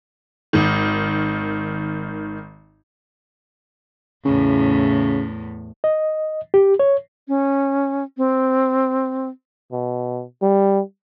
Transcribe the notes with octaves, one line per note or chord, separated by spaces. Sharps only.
G#1 D#3
E2 A2 C#3
D#5
G4
C#5
C#4
C4
B2
G3